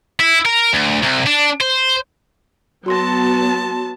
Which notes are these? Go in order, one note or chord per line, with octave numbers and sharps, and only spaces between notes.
E4
A#4
D2
C2
D4
C5
F#3 B3 F#4 A5 C6 A#6